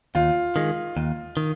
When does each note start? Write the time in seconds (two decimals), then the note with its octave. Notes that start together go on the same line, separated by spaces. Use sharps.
0.15 D#2 F4
0.56 D#3 G#3
0.97 D#2
1.37 D#3